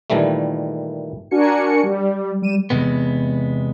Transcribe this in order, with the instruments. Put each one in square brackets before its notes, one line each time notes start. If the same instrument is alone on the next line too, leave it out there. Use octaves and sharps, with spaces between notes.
[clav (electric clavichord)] A#2 D#3 E3 G3 A3
[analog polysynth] D4 F#4 A#4 G#5 C#7
G3
G3 D#7 E7
[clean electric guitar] E2 G2 C3 G#3 B3